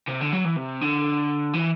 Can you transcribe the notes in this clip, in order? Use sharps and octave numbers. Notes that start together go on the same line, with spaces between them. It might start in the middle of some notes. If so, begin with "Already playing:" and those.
C3
D3
F#3
E3
C3
D3
E3